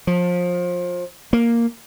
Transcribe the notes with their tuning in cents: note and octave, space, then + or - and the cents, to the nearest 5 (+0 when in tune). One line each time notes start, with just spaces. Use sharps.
F3 +25
A#3 +0